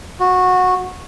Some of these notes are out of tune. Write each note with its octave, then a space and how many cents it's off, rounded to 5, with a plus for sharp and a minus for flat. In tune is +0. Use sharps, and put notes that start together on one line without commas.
F#4 -15